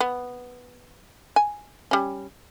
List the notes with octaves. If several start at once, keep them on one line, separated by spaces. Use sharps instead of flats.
B3
G#5
G3 C#4